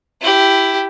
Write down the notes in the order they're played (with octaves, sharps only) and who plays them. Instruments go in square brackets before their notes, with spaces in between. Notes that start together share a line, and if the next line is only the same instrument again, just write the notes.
[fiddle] E4 G4